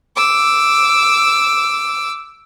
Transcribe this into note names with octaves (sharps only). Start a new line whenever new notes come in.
D6 E6